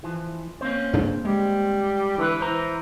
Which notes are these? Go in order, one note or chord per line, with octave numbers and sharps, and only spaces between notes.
E3 F3
A#3 C4 C#4 C5
G2 C#3 D4
G3 G#3
D3 E3 B4
E3 C5 A#5